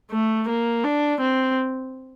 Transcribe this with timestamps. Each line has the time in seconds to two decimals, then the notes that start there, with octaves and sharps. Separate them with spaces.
0.11 A3
0.48 A#3
0.84 D4
1.21 C4